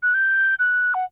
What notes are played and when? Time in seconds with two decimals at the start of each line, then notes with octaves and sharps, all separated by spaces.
0.03 F#6
0.14 G6
0.59 F#6
0.94 F#5